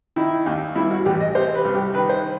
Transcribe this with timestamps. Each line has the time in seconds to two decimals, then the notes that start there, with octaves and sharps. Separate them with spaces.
0.16 D#3 E4
0.46 D#2
0.76 G2 E4
0.91 F#4
1.06 A1 G4
1.20 D#5
1.35 C3 C5
1.55 B4
1.65 C2
1.75 G4
1.94 D#3 B4
2.09 C5